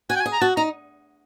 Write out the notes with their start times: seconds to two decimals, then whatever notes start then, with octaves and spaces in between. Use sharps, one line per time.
0.10 F#4 G#5
0.16 G5
0.20 G#5
0.26 G#4
0.33 A#5
0.41 F#4 A5
0.57 D#4 A#5